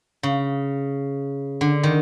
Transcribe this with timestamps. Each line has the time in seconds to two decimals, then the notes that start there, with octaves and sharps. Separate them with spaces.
0.23 C#3
1.61 D3
1.83 D#3